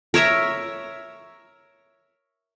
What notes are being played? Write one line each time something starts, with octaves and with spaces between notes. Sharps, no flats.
A#4 C#5 E5 A#5